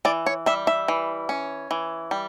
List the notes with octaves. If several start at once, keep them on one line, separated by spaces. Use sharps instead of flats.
E3 D5
C#5
G3 E5
E5
E3
C#4
E3
G3